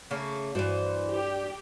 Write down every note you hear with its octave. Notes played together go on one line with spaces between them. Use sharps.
C#3 A3 A#3
G2 E3 F#4 C5 D5
G4